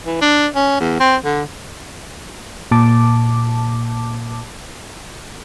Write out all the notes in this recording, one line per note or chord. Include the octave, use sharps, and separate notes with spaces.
E3
D4
C#4
E2
C4
D3
A#2 A5 D6